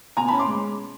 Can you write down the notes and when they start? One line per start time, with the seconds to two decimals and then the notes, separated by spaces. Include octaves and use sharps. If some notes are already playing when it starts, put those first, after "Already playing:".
0.17 B2 G#5 A#5
0.28 C#4 A5 B5
0.39 C6 D6
0.47 G#3